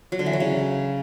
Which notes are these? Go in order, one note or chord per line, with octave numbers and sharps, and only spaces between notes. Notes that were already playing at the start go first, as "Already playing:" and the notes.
F#3
D3
E3
F#3
C#3